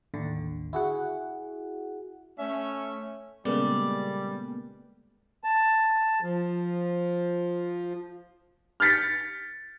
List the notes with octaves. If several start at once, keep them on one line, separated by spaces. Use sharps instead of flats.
A1 D#2 D3
E4 F#4 G#4 F#5
A3 C#4 E5
A#2 C#3 G3 G#3 A#3 B3 A4 D5
A5
F3
F6 G6 A6 B6 C#7